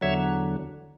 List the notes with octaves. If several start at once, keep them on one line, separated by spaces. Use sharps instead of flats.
E2 D3 F#3 C#5 E5